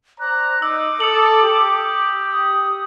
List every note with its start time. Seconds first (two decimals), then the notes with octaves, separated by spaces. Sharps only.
0.20 C5 D5 A#5 F#6
0.62 D#4 D6 E6
1.00 A4 D#6 C#7 F#7
1.43 G4
2.30 D#6